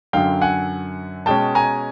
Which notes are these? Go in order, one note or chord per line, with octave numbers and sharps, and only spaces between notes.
F#2 D3 F#3 F5 G5
F#5 G#5
B2 G#3 C#4 G5 A5
G#5 A#5